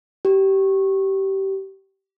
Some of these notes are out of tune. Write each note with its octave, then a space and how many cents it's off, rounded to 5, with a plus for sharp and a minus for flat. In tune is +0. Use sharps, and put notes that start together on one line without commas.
G4 -20